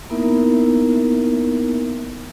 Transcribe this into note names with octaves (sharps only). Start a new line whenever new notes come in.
A#3 B3 D#4 E4 A#4 E5